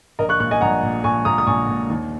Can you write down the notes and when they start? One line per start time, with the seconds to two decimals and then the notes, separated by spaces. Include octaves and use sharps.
0.19 A#1 A#4 D#5
0.29 C#6 F#6
0.40 A#2 C#6 F#6
0.51 D#5 G#5
0.61 A#1 F#5 A#5
0.83 A#2
1.04 A#1 G#5 C#6
1.25 A#2 A#5 D#6
1.38 D#6
1.47 A#1 G#5 C#6
1.68 A#2
1.90 D#2